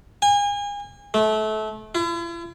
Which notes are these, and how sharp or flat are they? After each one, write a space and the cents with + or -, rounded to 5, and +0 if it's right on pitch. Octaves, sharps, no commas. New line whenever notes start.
G#5 -35
A3 -25
E4 +45